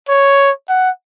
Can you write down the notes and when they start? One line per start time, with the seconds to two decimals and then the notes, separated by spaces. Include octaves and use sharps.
0.08 C#5
0.69 F#5